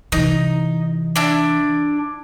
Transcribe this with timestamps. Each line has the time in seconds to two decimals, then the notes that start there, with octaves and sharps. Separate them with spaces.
0.12 C3 E3 D#4
1.16 D4 E4